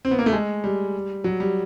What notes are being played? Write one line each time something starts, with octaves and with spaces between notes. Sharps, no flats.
C4
B3
A#3
A3
G#3
G3
F#3
G3